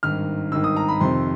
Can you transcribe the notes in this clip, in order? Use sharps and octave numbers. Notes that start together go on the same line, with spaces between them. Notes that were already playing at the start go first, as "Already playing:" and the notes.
G#1 G2 D#3 F6
G#1 G2 D#3 E6
D#6
A#5
B5
F2 C3 D#3 C6